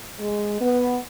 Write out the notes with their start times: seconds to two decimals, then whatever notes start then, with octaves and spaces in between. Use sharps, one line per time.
0.20 G#3
0.61 B3